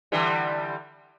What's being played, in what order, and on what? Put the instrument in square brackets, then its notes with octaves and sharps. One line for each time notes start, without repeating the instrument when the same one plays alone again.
[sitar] D3 E3 G3